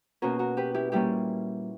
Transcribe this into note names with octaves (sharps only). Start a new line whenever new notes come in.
B2 A#3 C#4 F#4 A#4
F#4 A#4
G4 B4
E4 G4
A#2 G3 A#3 C#4 E4 G4